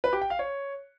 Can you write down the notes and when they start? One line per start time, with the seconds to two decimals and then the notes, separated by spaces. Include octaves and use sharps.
0.04 B4
0.13 G4
0.21 G5
0.30 F5
0.39 C#5